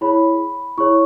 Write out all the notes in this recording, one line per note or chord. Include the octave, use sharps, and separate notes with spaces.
E4 G#4 C#5 B5
E4 G#4 C#5 C#6